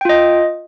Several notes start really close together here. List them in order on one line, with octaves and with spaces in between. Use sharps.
G5 F4 D#5